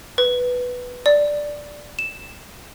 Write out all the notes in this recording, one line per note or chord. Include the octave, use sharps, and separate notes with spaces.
B4
D5
E7